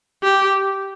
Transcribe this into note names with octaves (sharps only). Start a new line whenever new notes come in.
G4